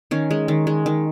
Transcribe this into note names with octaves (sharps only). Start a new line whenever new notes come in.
D#3 C#4
G#3
D#3
G#3
D#3